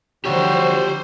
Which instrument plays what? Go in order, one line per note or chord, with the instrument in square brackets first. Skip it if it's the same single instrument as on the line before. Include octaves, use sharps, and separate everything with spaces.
[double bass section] D3 F3 [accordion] G3 F#4 [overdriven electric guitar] G4 C#5 [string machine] C5